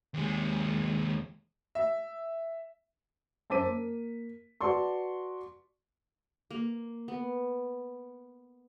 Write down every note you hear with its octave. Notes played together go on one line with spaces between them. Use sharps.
D#2 G#3
E5
F#2 C5 A5 D6 B6 D#7
A#3
F#4 B4 D5 A5 C6 C#6
A#3
B3